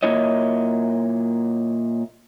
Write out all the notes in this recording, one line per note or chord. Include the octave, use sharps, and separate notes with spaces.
A#2 F#3 A#3 E4 C#5 D#5